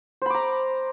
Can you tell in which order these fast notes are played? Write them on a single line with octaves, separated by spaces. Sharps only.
C5 B5 D6 A#5